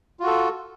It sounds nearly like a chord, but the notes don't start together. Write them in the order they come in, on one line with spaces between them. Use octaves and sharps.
F4 F#4 A4